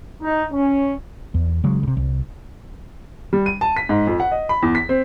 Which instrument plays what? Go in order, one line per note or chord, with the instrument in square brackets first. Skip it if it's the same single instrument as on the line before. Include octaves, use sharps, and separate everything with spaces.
[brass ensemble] D#4
C#4
[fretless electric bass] E2
C#3 F#3 G#3
D2 C3
C2
[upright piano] G3
D#7
A5
B6
G#2
F2
F#5
D#5
B5
E2
B6
C4